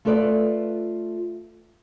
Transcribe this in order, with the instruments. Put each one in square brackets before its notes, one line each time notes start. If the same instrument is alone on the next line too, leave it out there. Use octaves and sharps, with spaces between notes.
[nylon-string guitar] A3 F4 A4 B4 D5